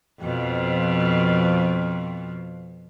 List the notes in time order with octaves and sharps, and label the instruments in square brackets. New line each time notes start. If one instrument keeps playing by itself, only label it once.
[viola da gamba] F2 B2 F3